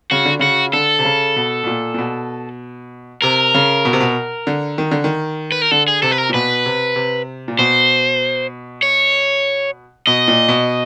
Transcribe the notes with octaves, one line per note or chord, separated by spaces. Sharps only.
C#3 F#4
D3
C#3 F#4
D3 A4
C3
C#3
B2
B2
A#2
A#2
B2
C3 A#4
C#3
B2
C3
B2
D3
D#3
D3
D#3
B4
A#4
D3 A4
G#4
C3 A4
B4
A#4
A#2
B2 B4
C3
C3
A#2
B2 C5
C#5
B2 D#5
A#2
B2